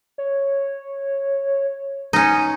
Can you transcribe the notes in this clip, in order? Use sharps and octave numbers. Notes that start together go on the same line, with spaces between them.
C#5
C#4 D#4